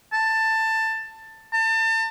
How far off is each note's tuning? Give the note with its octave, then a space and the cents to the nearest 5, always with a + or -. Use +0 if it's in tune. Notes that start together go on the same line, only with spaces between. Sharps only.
A5 +15
A5 +35